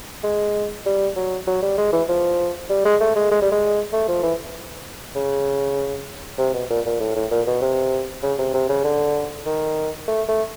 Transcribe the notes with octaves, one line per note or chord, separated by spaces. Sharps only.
G#3
G3
F#3
F#3
G3
G#3
E3
F3
G3
G#3
A3
G#3
G#3
G3
G#3
A3
F3
E3
C#3
C3
B2
A#2
A#2
A2
A2
A#2
B2
C3
C#3
C3
C3
C#3
D3
D#3
A3
A3